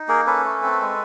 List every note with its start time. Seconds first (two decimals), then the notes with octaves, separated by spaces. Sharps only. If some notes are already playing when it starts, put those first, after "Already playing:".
Already playing: D#4
0.08 A#3 G#4 A#4
0.27 C#4 A4 B4
0.45 A3
0.63 C4
0.81 G#3